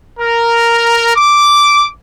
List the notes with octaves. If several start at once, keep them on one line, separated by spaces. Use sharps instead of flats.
A#4
D6